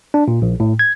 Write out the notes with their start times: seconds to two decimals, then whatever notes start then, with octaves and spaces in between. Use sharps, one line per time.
0.14 D4
0.28 A#2
0.42 A#1
0.60 A2
0.79 G#6